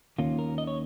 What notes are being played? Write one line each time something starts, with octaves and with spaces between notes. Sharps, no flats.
D#2 D#3 A#3 C#4 F4
A#4
D#5
C#5